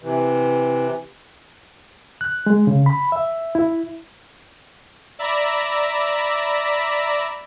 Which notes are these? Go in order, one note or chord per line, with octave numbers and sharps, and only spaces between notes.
C3 E3
F#6
G#3
C#3
B5
E5
E4
D5 E5 A#5 B5